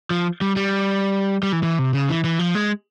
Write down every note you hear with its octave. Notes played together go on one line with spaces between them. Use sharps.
F3
G3
G3
G3
E3
E3
C3
C#3
E3
E3
F3
G#3